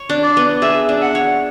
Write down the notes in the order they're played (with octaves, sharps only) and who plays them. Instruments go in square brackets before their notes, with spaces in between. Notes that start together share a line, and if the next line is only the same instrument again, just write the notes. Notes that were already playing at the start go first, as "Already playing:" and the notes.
Already playing: [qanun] C#5
D4
[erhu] D5
[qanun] B3
[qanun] G#4 [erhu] E5
[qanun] D4
[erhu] F#5
[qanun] C#5